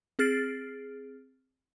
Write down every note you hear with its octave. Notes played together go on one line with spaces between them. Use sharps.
C4 G#4 F6 A6 C7 D7